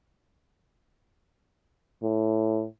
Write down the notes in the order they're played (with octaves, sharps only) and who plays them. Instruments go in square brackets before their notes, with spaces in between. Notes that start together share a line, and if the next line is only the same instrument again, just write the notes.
[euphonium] A2